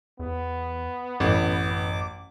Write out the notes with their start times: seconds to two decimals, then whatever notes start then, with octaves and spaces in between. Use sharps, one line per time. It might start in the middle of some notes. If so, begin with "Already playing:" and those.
0.19 E2 B3
1.20 A1 F#2 D6